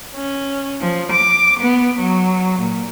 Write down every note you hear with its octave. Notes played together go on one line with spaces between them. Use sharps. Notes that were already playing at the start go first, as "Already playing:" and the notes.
C#4
F3
D6
B3
F#3
A#2